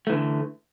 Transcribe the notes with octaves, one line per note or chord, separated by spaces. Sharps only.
D3 E3 A3